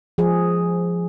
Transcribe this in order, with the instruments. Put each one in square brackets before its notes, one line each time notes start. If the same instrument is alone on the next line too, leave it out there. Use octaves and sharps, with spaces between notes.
[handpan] F3 G#4